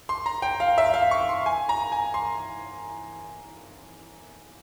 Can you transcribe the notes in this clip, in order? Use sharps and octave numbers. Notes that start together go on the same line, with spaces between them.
C6
A#5
G5
F5
E5
F5
C#6
C6
G#5
A#5
G#5
C6